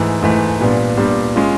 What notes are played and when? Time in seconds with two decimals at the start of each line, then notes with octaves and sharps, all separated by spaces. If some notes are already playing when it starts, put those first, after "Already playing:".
Already playing: G#2 E3 A3
0.22 G#2 E3 A3
0.60 A#2 G3 B3 D4
0.98 A#2 G3 B3 D4
1.36 G#3 C#4 F4